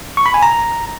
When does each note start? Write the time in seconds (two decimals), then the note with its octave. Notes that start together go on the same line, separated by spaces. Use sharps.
0.17 C#6
0.26 B5
0.34 G#5
0.42 A#5